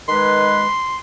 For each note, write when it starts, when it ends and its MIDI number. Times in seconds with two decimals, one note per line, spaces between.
0.08 0.66 51
0.08 0.66 56
0.08 0.66 71
0.08 0.97 84